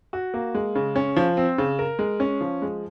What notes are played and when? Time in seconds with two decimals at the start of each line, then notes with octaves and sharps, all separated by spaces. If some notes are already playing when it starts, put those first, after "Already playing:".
0.13 F#4
0.34 A#3
0.55 G#3
0.75 C#3
0.96 C#4
1.16 F3
1.37 C4
1.58 C#3
1.79 A#4
1.99 G#3
2.20 C#4
2.41 F3
2.62 G#3